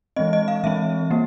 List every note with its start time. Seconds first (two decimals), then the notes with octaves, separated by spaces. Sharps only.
0.16 E3 G#3 C4 D#5
0.33 D#5
0.48 F5
0.64 E3 G#3 C4 E5
1.10 G3 A#3